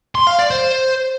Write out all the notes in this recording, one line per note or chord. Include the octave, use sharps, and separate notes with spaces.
C6
F5
D5
C5